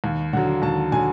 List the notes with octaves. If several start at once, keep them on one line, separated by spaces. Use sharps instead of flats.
D#2
D3 F#3 F#5
D#2 A5
D3 F#3 G#5